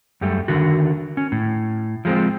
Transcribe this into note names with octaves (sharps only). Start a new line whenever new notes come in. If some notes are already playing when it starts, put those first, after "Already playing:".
F#2 G3 A3
D3 D#3 F#4
C#4
A2
F3 G#3 A3 C4